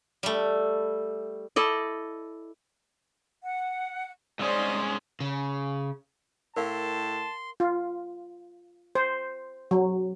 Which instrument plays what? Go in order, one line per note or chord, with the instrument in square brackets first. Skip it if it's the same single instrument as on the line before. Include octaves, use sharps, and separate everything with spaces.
[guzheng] G3 A3
[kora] E4 A4 D5 D#5
[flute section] F#5
[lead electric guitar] C2 C#4 [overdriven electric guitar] G#2 G#3 [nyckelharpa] C5 D#5 [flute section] D5
[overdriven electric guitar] C#3
[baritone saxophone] A2 [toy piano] A#4 F5 [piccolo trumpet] A5 [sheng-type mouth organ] C6
[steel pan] F4
C5
F#3